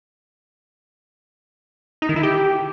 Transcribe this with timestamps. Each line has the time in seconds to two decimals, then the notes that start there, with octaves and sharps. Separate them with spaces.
2.02 D#4
2.09 D#3
2.16 E4
2.23 G4